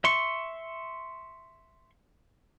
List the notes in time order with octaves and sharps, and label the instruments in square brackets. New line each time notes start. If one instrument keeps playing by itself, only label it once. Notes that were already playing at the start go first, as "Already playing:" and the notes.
[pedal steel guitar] E5 C6 C#6